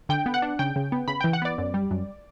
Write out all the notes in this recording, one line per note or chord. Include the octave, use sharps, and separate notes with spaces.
D3 G5
B3
F#5
D4
C#3 G5
C#3
B3
C#3 B5
E3 G5
F#5
B3 D5
F#2
G3
F#2